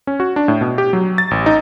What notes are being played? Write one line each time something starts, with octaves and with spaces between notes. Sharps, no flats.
C#4
F#4
D4
A2
B2
G4
F#3
A6
A1
D#4